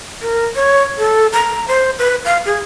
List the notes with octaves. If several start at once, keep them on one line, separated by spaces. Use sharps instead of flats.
A#4
C#5
A4
A#5
C5
B4
F5
G#4